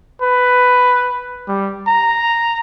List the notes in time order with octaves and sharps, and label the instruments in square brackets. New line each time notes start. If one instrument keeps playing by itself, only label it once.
[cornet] B4
G3
A#5